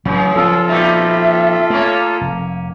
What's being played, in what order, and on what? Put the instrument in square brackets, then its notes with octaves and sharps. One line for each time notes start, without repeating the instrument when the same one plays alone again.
[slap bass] A1 F#3 [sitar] F#2 C#3
[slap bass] F3 C4 [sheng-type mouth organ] F4 A4 [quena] E6
[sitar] A#2 G3 D#4 [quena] E5
[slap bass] A3 [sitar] A#3 C#4
[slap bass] F1